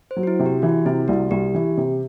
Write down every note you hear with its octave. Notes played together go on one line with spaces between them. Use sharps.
C5
F#3
F#4
E4
C3
G4
E3 F#4
C3 E4
C2 F#4
C2 G4
E3
C3